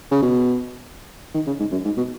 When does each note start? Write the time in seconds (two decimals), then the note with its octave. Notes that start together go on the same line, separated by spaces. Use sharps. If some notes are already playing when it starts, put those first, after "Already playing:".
0.11 C#3
0.22 B2
1.34 D#3
1.47 C#3
1.60 G#2
1.72 F#2
1.85 G#2
1.97 B2